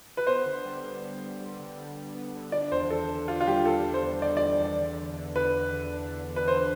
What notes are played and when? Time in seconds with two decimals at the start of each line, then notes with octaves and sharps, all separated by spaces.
0.17 B4
0.27 B3 C5
0.45 D3
0.64 G3
0.83 D3
1.02 B3
1.21 G3
1.40 G3
1.58 D3
1.77 G3
1.96 G3
2.15 B3
2.34 D3
2.52 D4 D5
2.71 E2 C5
2.90 E2 A4
3.09 D3
3.28 D4 F4
3.40 F4
3.47 G3 G4
3.65 G3 A4
3.84 D4
3.94 C5
4.03 E2
4.22 G3 D5
4.37 E2 D5
4.60 E2
4.79 D3
4.97 D3
5.16 D3
5.35 D3 B4
5.54 D3
5.73 D3
5.92 D4
6.10 D3
6.29 D3
6.36 B4
6.48 D3 C5